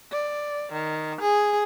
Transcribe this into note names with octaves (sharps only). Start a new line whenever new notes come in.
D5
D#3
G#4